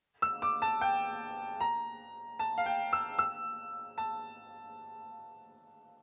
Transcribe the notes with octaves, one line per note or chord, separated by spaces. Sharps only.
E6
D6
A5
G5
A#5
A5
F5
G5
E6
E6
A5